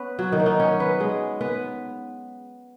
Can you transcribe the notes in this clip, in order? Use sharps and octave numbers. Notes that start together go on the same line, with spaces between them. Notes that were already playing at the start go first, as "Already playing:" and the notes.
Already playing: B3 C#4 B4 C#5
F#3 F#4
D#3 D#4
F#4
D#3 D#4
C#4 C#5
B3 B4
G#3 G#4
B3 B4